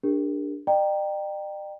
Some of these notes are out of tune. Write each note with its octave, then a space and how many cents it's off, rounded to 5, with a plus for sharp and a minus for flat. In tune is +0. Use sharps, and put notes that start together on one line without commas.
D4 +0 G4 +45 A#4 +0
D5 +45 G5 +0 A#5 +0